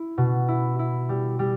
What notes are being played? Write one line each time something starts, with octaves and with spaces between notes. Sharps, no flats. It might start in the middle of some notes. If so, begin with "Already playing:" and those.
Already playing: E4
B2
E4
E4
G3
G3